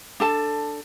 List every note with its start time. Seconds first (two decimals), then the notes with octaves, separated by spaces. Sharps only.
0.20 D4 A4 A5